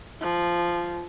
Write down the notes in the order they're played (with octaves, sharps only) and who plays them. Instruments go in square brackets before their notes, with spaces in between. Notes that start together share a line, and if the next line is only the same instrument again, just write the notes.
[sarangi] F3